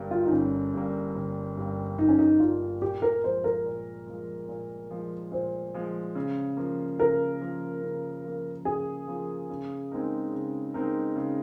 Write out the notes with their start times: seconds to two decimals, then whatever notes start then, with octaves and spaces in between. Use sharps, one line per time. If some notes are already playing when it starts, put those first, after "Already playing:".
Already playing: G1 G2 G3 A#3
0.11 F4
0.26 D#4
0.31 G1 C#4
0.74 G2 G3 A#3
1.15 G1
1.57 G2 G3 A#3
1.98 G1 D#4
2.09 C#4
2.19 D#4
2.39 G2 G3 A#3 F4
2.82 A#2 G4
3.02 A#4
3.24 F3 G#3 C5
3.44 A#4
3.65 A#2
4.07 F3 G#3
4.48 A#2
4.91 F3 G#3
5.31 A#2 C5
5.74 F3 G#3
6.15 C#3
6.57 F3 A#3
6.99 C#3 A#4
7.41 F3 A#3
7.83 C#3
8.24 F3 A#3
8.65 C#3 G#4
9.07 F3 A#3
9.50 C#3
9.92 G#3 C4 D#4 A#4
10.33 C#3
10.74 G#3 C4 D#4 A#4
11.16 C#3